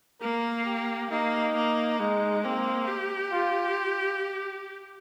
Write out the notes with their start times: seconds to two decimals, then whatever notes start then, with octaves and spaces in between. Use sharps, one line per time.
0.21 A#3 A#4
0.65 G4
1.10 A#3 D#4
1.55 A#3
1.99 G#3 D#4
2.44 A#3 C4
2.88 G4
3.32 F4